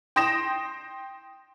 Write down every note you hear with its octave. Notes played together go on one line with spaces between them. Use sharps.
G5 C6 D#6 A#6 E7